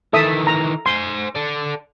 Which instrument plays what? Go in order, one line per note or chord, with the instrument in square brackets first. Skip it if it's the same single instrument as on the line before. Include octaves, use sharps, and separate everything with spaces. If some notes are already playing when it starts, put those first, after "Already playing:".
[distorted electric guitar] D#3 E3 [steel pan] A4 E5 D#6
[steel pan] A#5
[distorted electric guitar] C5 G#5 [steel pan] C6
[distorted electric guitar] A4 D5